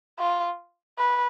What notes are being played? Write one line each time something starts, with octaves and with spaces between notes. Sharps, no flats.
F4
B4